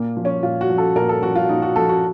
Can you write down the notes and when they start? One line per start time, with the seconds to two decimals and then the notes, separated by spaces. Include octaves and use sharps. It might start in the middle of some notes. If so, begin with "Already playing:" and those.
Already playing: A#2 A#3
0.17 F3
0.25 C#4
0.43 A#2 F4
0.61 F#4
0.70 F3
0.78 A4
0.96 A#2 A#4
1.09 A4
1.22 F3 F#4
1.35 F4
1.49 A#2 D#4
1.62 F#4
1.76 F3 A4
1.89 F#4